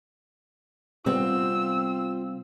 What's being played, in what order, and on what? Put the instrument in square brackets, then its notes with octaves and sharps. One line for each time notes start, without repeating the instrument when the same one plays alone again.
[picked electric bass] C3 G3 B3 [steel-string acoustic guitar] C4 [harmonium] F4 [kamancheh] E6